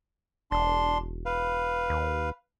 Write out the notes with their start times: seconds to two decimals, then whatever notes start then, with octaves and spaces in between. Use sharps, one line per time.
0.51 E1 D4 C6
1.26 B4 F5
1.90 D#2